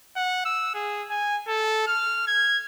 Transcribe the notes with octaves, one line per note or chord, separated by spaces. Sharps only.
F#5
E6
G#4
G#5
A4
F6
G#6